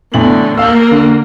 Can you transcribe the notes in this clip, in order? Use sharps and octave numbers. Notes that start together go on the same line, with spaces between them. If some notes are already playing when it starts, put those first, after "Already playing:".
E2 A2 D3 F#7
A#3 F5 E6
D3